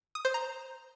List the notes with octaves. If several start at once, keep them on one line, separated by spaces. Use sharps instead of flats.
D#6
C5
A#5